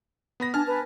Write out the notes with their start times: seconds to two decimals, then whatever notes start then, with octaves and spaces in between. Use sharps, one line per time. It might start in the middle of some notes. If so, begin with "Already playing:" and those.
0.40 B3 B5 A#6
0.54 D4 G#5 A5 F6
0.66 B4